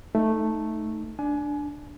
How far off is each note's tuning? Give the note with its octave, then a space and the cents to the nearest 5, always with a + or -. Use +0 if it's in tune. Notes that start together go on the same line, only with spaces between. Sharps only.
A3 +0 D#4 +0
D4 +0 G#5 +25